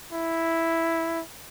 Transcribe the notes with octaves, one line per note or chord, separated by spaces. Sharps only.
E4